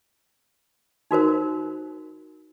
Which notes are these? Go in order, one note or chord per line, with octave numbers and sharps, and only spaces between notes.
D#4 F#4 A#4 C5